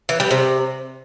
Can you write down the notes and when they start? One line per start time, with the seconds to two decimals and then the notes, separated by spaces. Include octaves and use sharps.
0.09 E3
0.20 G3
0.31 C3